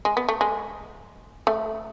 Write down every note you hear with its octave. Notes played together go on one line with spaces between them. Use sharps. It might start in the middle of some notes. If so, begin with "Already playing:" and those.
G#3
B3
A3
G#3
A3